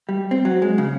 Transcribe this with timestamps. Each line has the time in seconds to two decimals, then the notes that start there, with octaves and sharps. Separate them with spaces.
0.09 G3
0.31 C4
0.45 F#3
0.62 G#3
0.78 C#3